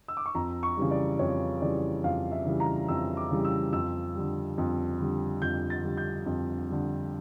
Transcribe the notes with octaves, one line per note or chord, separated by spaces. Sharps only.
E6
D6
C#6
F2 A#5
C#6
C#3 E3 G3
D5
F2 C#5
C#3 E3 G3 D5
F2 F5
E5
C#3 E3 G3
A#5
F2 E6
D6
C#3 E3 G3
E6
F2 E6
D3 G3
F2
D3 G3
F2 G6
A6
D3 G3
G6
F2
D3 G3